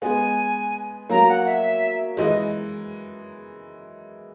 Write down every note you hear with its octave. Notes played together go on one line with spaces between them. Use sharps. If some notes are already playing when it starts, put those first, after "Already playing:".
G#3 B3 G#5
F#3 A#3 A#5
F#5
E5
E3 G#3 D#5